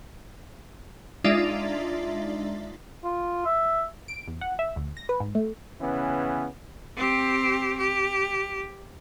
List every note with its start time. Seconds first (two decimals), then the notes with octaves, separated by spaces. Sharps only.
1.24 G#3 D4 D#4 F4 D5 E5
3.04 F4
3.46 E5
4.08 D7
4.28 E2
4.41 F#5
4.59 E5
4.76 D2
4.97 A#6
5.09 B4
5.20 G#2
5.35 A3
5.80 C#3 E3 B3 C#4
6.97 C4 G4
7.77 G4